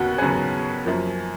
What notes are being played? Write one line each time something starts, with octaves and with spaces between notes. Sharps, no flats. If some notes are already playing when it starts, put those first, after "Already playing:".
Already playing: D#2 C#3 B3 F#4
D#2 C#3 F#3 B3 G#4
F#2 F3 A#3